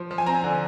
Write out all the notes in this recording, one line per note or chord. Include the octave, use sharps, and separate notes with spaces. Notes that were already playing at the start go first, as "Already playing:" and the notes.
Already playing: F3
F3
G#5
C4 A#5
D3